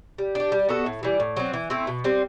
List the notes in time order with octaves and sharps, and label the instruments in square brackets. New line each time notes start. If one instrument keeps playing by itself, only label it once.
[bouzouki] G3
D4 G4
G3
B3 F#4 A4
A2
E3 G3
A2
F#3 C4
E3
A3 C4 E4
B2
G3 C4